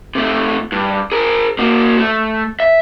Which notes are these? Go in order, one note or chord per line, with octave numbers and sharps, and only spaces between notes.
C3 A3
G2
G#4 A#4
A#3 F#4
A3
E5